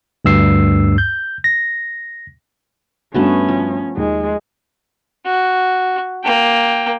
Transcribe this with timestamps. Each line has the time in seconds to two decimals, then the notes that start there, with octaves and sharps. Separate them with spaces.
0.25 D2 G2 E6 C7
0.98 G6
1.44 A#6
3.14 G2 A3 B3 C#4 F#4 A5
3.49 F3
3.97 D#2 G#3
5.26 F#4
6.24 A#3 G5